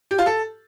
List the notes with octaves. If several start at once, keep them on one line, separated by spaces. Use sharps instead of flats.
G4
F4
A4